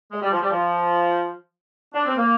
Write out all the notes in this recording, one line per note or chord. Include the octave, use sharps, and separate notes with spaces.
G#3
G3
F3
G3
F3
D4
C4
A#3